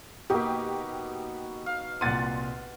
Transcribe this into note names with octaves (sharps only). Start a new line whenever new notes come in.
B2 A#3 D#4 F#4 G4
F5
C2 A#2 F#5 C6 A6 D#7